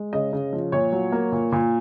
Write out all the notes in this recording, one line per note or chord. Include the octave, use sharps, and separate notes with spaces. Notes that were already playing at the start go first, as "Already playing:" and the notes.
Already playing: G#3
C#3 D#5
C#3
F3
A#2 C#5
F#3
A#3
A#2
A#2